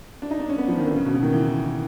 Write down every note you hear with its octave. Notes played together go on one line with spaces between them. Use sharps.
D4
D#4
D4
C#4
B3
F3
D#3
D3
C#3
B2
C#3
D#3
E3